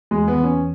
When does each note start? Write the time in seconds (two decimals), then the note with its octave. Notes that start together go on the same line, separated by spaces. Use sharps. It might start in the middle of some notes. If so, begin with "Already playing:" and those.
0.11 E2 G#3
0.28 B3
0.36 E2
0.43 C#4